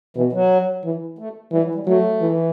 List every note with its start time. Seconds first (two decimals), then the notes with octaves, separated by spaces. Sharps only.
0.16 B2 E3
0.33 F#3
0.84 E3
1.19 A3
1.52 E3 G3
1.63 F#3
1.75 G3
1.87 F#3 A3
2.21 E3